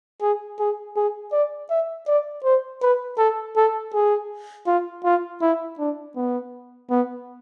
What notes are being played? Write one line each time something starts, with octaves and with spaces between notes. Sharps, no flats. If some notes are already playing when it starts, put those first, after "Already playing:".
G#4
G#4
G#4
D5
E5
D5
C5
B4
A4
A4
G#4
F4
F4
E4
D4
B3
B3